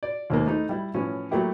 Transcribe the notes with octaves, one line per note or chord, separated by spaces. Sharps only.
D5
D#2 G#2 A#3
A3 D#4 E4
G3 E4
A2 E3 F3 C#4
F#3 A3 A#3 E4 G4